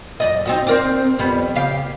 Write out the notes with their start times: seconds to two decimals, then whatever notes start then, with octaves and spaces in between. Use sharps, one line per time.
0.20 F#2 D5 D#5
0.46 C4 D#4 F#4
0.67 C4 A#4 D5
1.19 F2 G3 B3
1.55 C#3 G4 F5